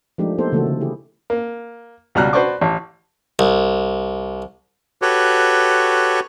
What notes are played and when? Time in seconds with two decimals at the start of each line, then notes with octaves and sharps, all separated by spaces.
0.18 F3 G#3 A3 D4 D#4 G4
0.38 A#3 B3 D#4 G4 A4 C5
0.52 C#3 E3 A3 A#3 F#4 A4
0.66 D3
0.81 E4 G4 G#4
1.30 A#3
2.15 C#2 B2 G3 A#5 F6 F#6
2.33 F#4 B4 C5 D5 C#6 D6
2.61 A1
3.39 C2
5.02 F#4 G4 A4 B4 C#5